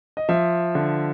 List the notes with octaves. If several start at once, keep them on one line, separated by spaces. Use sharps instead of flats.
D#5
F3 E5
D3